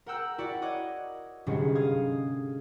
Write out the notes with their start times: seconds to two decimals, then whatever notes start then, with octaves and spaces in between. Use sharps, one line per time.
0.06 A#4 F#5 G5 E6 F#6
0.38 E4 F#4 D5 F#5
0.62 C#5 D#5 D6 F#6 G#6
1.46 G1 G#2 C3 F#3 G#3 C#4
1.75 F5 D#6 G#6